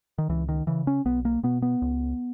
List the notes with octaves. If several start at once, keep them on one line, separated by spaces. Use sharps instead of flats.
D#3
C#2 E3
D#3
C#3 E3
C#4
B1 B3
A#3
B2 B3
B3
C#2